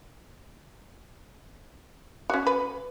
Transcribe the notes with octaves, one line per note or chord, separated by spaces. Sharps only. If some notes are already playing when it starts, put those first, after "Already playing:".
C#4 F#4
B4